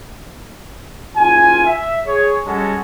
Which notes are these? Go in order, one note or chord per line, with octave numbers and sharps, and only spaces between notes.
F#1 F4 G#5
E5
G#4 C#5
G3 G#3 C#4 F#4 A4